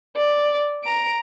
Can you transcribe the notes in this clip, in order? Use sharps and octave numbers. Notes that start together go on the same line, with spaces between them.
D5
A#5 D7